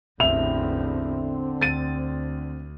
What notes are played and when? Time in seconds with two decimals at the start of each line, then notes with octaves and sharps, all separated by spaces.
0.20 A1 E2 D3 C4 E5 F7
1.61 D2 A6 D#7